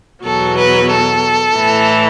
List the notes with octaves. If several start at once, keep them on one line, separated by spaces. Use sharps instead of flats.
E2 B2 F#3 A4
B4
A4
A2 E3